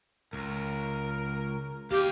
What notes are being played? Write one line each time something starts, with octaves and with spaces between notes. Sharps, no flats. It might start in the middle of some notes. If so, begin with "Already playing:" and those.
C#2 A#4
D#2 G4 F5 G5